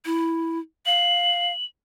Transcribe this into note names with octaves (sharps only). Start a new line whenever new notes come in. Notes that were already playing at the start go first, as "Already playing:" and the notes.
E4
F5 F#7